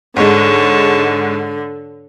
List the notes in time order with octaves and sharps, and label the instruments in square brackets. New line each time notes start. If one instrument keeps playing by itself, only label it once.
[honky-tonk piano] G#2 G#3 [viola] D3 [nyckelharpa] C#5 A5